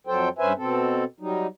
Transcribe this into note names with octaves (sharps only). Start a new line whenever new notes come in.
F2 F#3 A4 C5 G5
G2 C#4 B4 C5 E5 G#5
B2 C4 A4
F#3 G3 D#4